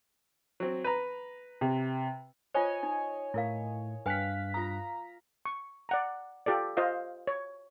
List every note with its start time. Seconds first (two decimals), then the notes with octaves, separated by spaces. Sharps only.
0.60 F#3 C4
0.84 B4 A#5
1.61 C3
2.54 F4 C5 C#5 D#5 G#5
2.83 D#4
3.34 A2 E4 A#4 F5
4.06 G2 B4 F5 G5 G#5 F#6 B6
4.54 F4 A#5 D#6
5.45 C#6
5.89 D5 F#5 A#5
6.46 F4 G4 A4 D5
6.77 F4 C5 D#5 F5
7.27 C#5